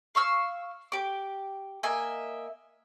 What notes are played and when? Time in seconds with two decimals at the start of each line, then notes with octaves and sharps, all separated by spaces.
0.15 F5 C#6 E6 F6
0.92 G4 D6
1.83 A#3 D#5 E5 G#5